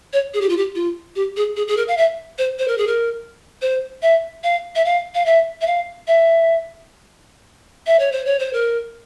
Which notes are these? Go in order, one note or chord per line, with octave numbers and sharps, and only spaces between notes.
C#5
G#4
G4
F4
G4
F4
G4
G#4
G#4
G#4
A#4
F5
E5
C5
C5
A#4
G#4
A#4
C5
E5
F5
E5
F5
F5
E5
E5
F5
E5
E5
C#5
C5
C#5
C5
A#4